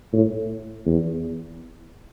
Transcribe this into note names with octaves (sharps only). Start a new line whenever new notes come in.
A2
E2